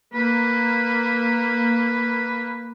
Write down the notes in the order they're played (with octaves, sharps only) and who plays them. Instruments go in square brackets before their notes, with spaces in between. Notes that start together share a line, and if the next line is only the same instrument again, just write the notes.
[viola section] A#3 [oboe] B4